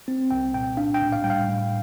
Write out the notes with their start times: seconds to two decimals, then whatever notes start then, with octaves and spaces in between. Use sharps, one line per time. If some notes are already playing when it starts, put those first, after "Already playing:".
0.08 C4
0.31 C2 G5
0.54 A#2 G5
0.77 D4 F5
0.94 G5
1.01 A2
1.12 F5
1.24 G3 G5
1.30 F5
1.47 A2